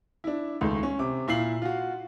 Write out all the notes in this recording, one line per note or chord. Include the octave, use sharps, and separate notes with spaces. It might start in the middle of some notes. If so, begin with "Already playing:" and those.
D4 E4
C#2 D#3 A3
C#4
C3 D6
A#2 E4 F5 C7 F#7
F4 F#4